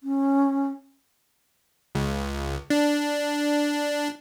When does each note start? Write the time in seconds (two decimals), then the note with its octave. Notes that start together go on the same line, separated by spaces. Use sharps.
0.03 C#4
1.95 C#2
2.70 D4